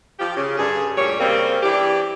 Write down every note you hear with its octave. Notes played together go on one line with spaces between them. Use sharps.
F3 G4
C#3
G2 D3 G#4
D2 A#2 G3 C#5
C#3 G3 A#3 C4
E3 D4 G4